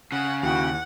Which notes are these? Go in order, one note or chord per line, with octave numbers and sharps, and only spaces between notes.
C#3 F#5
D#2 E4 F#4 F#5 G5